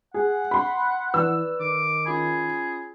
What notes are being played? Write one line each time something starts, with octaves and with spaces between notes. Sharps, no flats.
G#4 F#5
B5 C6
E3 B4 D5 E6
D#3 D6
C#4 F4 G#4 B5